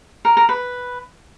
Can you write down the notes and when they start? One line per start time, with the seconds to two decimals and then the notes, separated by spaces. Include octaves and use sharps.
0.25 A#4
0.37 A#4
0.49 B4